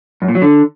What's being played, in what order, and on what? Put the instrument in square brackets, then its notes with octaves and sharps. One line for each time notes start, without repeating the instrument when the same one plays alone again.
[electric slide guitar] F#2
A#2
F#3
D3